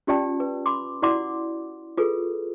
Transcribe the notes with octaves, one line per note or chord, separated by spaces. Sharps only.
C#4 F4 G4 D5 G5 A5
B4
B5 C6 D6
E4 F#4 D5 F#5 C6 D6
F4 G#4 A4 B4